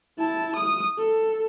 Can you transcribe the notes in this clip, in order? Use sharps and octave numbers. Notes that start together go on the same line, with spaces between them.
E4 A5
D#6
A4